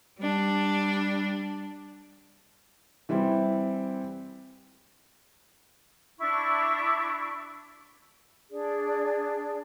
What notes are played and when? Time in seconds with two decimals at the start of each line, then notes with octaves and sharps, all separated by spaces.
0.20 G3 D4
3.09 E3 G3 C4 E4
6.19 D4 E4 C#6
8.49 D4 G#4 D5